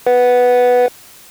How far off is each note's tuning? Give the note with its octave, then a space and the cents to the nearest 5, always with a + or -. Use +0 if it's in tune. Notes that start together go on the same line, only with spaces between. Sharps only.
B4 +0 F#5 +0